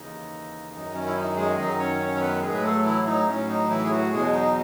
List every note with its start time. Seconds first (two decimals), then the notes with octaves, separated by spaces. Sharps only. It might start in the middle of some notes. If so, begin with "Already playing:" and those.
Already playing: D#2 C#3 E3 D#4
0.72 F#2 D#3 F#3 D#4
0.94 C#4
1.06 E4
1.16 D#4
1.36 G#3 G#4
1.57 F#2 D#3 F#3 D#4 D#5
1.79 C#4 C#5
2.00 C#4 C#5
2.16 C#5
2.21 B3 B4
2.42 A2 F#3 G#3 G#4
2.54 B4
2.63 A3 A4
2.84 E3 E4
3.07 D#4
3.27 A2 F#3 C#4
3.48 D#4
3.69 E3 E4
3.84 G#4
3.90 F#3 F#4
4.12 E2 B2 F#3 G#3 G#4
4.33 D#4